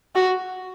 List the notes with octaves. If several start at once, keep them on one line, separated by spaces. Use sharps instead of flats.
F#4